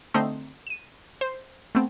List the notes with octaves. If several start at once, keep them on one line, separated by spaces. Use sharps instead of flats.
D3 A3 C4 D#4 C6 E6
D#7 E7
C5
A3 B3 C4